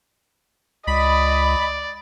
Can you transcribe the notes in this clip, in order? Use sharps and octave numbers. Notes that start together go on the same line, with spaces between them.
C#2 D5 D#5 B5